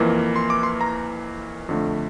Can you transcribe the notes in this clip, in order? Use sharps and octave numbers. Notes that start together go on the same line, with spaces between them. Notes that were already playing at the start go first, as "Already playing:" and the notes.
Already playing: F2 E3 A#3
C6
D6
C6
A#5
F2 D3 A3